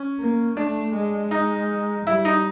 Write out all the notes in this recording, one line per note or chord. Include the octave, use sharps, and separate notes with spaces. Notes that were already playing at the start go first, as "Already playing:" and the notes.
Already playing: C#4
A#3
A3 D4
G#3
D#4
G3 E4
D#4